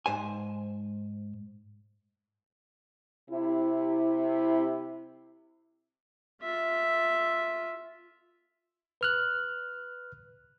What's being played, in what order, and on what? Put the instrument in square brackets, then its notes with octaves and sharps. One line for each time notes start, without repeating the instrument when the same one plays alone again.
[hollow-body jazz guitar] G#2 C5 G#5
[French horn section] C3 E4
[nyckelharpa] F4 E5
[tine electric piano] B4 F6 F#6